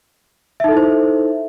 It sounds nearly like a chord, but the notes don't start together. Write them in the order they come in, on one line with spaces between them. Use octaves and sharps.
E5 D#4 A4 E4 C5